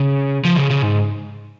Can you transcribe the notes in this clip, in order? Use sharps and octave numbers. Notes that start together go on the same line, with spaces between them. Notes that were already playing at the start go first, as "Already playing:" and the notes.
Already playing: C#3
F3
C#3
C#3
G#2